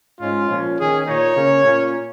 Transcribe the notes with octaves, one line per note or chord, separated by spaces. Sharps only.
G#2 G#3 C#4 F4
A#2 F3 C#4
D#3 C#4 G#4
A#2 A#3 D#4 C#5
C#3 A#3 C#4
A#2 A#3 C#4